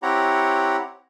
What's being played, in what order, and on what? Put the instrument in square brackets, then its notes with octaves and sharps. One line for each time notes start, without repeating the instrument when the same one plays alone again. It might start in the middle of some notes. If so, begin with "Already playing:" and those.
[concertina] C4 E4 G4 C#5 F#5 A#5